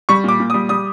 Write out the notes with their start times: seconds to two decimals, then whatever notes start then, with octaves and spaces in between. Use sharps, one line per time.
0.09 G3 C#6
0.24 A#2 D6
0.40 A#2
0.50 D#6
0.54 G3
0.69 G3 D#6